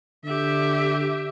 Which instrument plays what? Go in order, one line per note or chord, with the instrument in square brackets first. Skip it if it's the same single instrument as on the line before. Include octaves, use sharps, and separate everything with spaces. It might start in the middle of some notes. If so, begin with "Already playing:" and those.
[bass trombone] D3 [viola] G4 E5